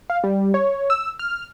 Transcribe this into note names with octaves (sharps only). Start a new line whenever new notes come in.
F5
G3
C#5
E6
F6